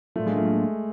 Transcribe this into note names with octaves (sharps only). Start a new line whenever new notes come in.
A2 F#3 A3 A#3 D4 F4
G#3
A3